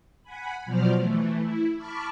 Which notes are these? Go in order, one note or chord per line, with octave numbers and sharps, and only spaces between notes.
F#5 G#5 B5
B2 F3 F#3 C5 D5 F6
E3 A3
E4
A5 B5 C#6 D6 F6